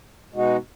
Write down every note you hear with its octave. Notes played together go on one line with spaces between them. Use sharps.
B2 G#3 D#4 F#4